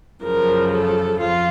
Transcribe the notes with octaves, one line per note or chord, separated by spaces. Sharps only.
F#2 C#3 F3 A#4
A4
F2 F4